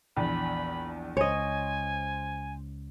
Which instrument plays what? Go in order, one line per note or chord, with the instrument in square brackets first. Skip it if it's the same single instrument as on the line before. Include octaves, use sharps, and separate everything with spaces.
[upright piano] A#1 E2 [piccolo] B5
[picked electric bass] C#2 [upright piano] C5 [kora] C#5 D#5 [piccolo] G#5